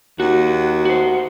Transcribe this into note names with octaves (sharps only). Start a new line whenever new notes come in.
D#2 F#4
F#4 C5